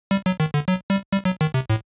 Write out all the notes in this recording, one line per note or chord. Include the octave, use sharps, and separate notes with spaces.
G3
F#3
D#3
D3
F#3
G3
G3
F#3
D#3
C3
A2